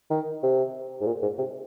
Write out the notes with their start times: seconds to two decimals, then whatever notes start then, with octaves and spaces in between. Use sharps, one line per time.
0.10 D#3
0.43 C3
1.01 G#2
1.07 A#2
1.22 G#2
1.38 C3